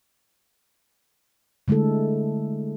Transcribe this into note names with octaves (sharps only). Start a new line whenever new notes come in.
D3 G#3 A3 E4 A4